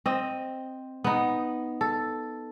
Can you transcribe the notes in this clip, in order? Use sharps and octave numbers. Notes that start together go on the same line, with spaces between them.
C4 D#5
B3 D#4
A4